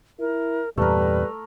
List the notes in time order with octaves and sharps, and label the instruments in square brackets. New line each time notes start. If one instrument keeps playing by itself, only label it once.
[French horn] E4 [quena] A#4
[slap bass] E2 G2 A#2 [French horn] G3 [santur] A3 A#4 [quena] B4